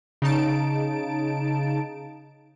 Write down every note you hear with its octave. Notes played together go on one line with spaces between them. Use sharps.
C#3 D#4 A5 D7